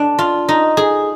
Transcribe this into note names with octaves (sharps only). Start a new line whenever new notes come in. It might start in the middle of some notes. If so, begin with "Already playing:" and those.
Already playing: D4
F4
D#4
G#4